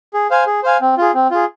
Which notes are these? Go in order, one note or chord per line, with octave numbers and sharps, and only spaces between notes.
G#4
C5 F5 G#5
G#4
C5 F5 G#5
C4
F4 G#4
C4
F4 G#4